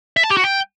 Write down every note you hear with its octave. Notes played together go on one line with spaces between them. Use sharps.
E5
A5
G4
F#4
G5